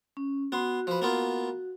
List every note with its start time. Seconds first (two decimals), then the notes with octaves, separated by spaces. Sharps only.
0.17 C#4
0.52 B3 F#4 C6
0.87 F3 B4
1.02 A#3 B3 F4